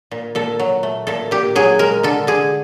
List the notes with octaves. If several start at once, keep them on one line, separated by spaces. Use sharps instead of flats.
A#2
A#2 A4
F#3
A3
A#2 A4
A#2 G4
F#3 G#4
G#3 A#4
D3 A4
D3 G#4